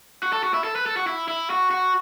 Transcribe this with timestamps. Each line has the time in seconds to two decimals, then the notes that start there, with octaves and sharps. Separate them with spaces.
0.23 F#4
0.33 A4
0.44 F#4
0.54 E4
0.64 A4
0.76 B4
0.86 A4
0.96 F#4
1.07 E4
1.28 E4
1.50 F#4
1.71 F#4